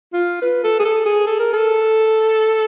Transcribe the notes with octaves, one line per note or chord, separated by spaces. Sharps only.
F4
B4
A4
G#4
A4
G#4
A4
A#4
A4